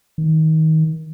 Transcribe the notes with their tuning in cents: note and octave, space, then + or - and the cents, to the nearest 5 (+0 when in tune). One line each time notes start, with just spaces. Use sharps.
D#3 +25